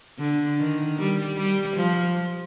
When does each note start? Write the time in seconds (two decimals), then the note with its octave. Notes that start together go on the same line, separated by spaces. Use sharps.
0.19 D3
0.58 D#3
0.98 G3
1.38 G3
1.77 F3